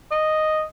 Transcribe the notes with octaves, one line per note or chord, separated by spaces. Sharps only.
D#5